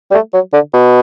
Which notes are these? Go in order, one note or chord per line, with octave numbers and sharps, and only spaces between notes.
G3
A3
F#3
D3
B2